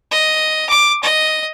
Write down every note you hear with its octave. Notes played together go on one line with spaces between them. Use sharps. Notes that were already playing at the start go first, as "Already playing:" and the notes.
D#5
D6
D#5